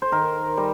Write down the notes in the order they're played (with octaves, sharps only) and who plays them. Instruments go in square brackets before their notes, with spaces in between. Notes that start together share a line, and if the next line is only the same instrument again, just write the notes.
[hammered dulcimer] C5
D#3 A#4
G3 C5